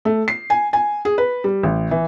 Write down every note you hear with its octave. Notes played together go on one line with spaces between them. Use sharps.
A3
C7
G#5
G#5
G#4
B4
G3
A1
E3